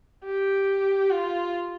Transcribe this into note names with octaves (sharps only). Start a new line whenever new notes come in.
G4
F4